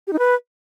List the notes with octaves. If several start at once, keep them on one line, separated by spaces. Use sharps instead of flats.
G4
D#4
B4